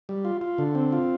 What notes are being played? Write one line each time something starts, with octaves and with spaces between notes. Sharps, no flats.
G3
F4
F4
D3
C4
F4